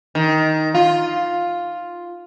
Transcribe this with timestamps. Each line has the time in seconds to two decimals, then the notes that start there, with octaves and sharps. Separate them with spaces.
0.15 D#3
0.74 F4